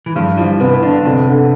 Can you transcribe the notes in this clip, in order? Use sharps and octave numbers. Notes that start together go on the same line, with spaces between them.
E3
G2 D3 F3
E3 F3 G3
C3 E3 B3
D3 D4
F2 C3
D3